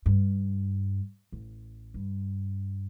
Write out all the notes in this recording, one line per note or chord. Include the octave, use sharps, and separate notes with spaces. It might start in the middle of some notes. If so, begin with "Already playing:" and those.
G2
A1
G2